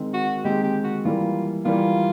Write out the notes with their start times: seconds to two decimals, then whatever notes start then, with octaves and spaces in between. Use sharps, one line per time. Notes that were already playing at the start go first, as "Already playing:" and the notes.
Already playing: D#3 G#3 C4
0.14 F#4
0.44 D#3 G#3 C4 G4
0.64 G4
0.84 F#4
1.05 E3 G3 A#3 F4
1.65 E3 G3 A#3 F4